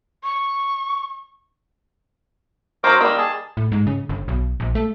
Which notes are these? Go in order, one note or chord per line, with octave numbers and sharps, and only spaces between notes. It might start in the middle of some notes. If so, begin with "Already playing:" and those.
C#6
F#3 C#4 A#4 C5 D6
D#3 G3 A#3 E6
G#4 A5
A2
G#2
C#3
G1
B1
A#1
A3